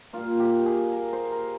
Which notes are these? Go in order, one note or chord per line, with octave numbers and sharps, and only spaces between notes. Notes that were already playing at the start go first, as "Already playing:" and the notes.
A#2 G3 A#3 F4
G4
G#4
A#4
C5
A#4